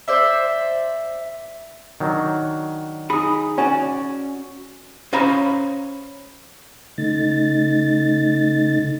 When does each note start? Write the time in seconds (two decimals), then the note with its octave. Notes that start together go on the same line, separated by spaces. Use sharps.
0.08 C5 D5 E5
2.00 D#3 F#3 D4
3.10 D#4 G#4 B5 D#6
3.58 C#4 F#4 C#5 D5 G#5
5.13 C#4 C5 F5 A#5 B5
6.98 C#3 A3 D#4 A6